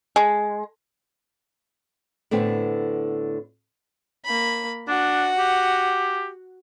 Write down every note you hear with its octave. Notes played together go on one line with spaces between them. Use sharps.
G#3
A2 D3 B3 C4
A#3 B5
D4 F#4 F#5
G4